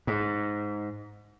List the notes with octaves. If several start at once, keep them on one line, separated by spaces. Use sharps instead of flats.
G#2